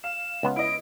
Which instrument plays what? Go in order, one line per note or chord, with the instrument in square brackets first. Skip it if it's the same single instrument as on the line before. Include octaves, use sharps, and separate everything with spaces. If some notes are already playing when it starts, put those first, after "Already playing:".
[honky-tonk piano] F5 [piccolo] E7
[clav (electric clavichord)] C#2 B3
[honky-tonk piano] E4 D#5 [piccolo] D7